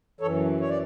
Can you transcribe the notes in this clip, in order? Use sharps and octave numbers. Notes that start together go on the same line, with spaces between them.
F#2 E3 A4 C#5
C#5
D5